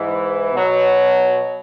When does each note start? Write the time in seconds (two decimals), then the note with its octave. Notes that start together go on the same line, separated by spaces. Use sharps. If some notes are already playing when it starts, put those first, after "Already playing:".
Already playing: G#2 E3
0.53 B2 F#3